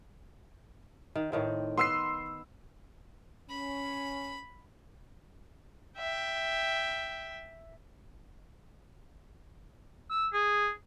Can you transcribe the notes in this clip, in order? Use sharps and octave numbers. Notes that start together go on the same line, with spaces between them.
D#3
A2 D#3 C4
B3 B4 C6 E6 C7
C#4 B5
E5 G5
E6
G#4